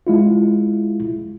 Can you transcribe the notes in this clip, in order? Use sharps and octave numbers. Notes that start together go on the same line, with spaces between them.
G#3 E4 F4